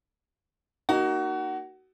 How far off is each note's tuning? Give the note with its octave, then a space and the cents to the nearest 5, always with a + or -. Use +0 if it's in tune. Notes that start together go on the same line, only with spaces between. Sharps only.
A#3 +0 D#4 -10 F#4 +25